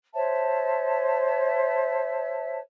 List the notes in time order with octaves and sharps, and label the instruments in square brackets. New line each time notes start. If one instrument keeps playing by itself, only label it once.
[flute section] C5 C#5 E5 A5